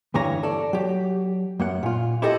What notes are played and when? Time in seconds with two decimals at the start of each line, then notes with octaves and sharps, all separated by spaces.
0.14 D2 G2 E3 C#5 A#5
0.43 A4 D5
0.73 F#3 G4
1.59 F#2 A#3 F#5
1.83 A#2 F4
2.22 E4 G4 A4 C5 D#5